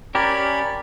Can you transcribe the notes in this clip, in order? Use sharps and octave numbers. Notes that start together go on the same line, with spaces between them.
C#4 G4 A#4 D5 B5